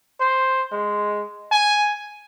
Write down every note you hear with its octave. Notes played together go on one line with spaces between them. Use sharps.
C5
G#3
G#5